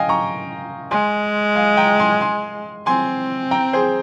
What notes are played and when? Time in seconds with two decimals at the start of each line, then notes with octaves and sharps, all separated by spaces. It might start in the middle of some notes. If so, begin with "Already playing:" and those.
Already playing: D#5 F5 G5 G#5
0.09 A#5 C#6
0.91 G#3 G#5 C6
1.55 F5 G#5
1.77 G5 A#5
1.99 G#5 C6
2.21 G#5 C6
2.86 C4 G#5 C6
3.51 G5 A#5
3.73 G#4 C5